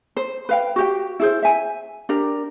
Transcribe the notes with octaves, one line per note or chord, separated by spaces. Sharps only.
C5
B4 F5 G5
F#4 G4 G5
E4 G#4 C5
E5 G#5
D4 G4 A#4